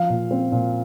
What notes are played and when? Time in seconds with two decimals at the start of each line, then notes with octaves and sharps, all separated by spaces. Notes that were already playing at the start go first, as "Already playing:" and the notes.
Already playing: F3 F5
0.10 A#2
0.31 C4
0.52 A#2